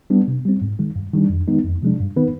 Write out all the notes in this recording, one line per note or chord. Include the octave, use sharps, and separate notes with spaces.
G3 B3 D4
C3
G3 C4
G#2
D#3 G#3
G2
D#3 G3 D4
F2
D#3 G#3 B3 D#4
F2
C3 F3 G#3 D4
G2
D#3 B3 D#4 B4